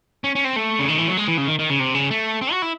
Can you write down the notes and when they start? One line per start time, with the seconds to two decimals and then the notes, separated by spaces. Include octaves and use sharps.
0.24 C#4
0.35 C#4
0.45 C4
0.56 A3
0.79 C#3
0.88 D#3
0.98 E3
1.08 F#3
1.17 G#3
1.28 E3
1.38 C#3
1.48 D#3
1.59 D#3
1.70 C#3
1.80 C3
1.94 C#3
2.11 A3
2.41 C4
2.52 F#4
2.62 E4